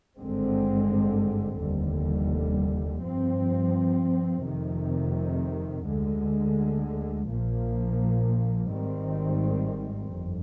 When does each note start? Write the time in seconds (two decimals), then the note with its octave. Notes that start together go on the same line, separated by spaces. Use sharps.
0.18 G#1 G2 D3 G#3 C4
1.60 F1 D#2 D3 G3
3.03 G2 F3 C4
4.44 F1 F2 C3 D#3
5.87 D2 D3 G#3
7.27 A#1 A#2 F3 A#3
8.69 G#1 G#2 D#3 G3 C4
10.12 G1 F2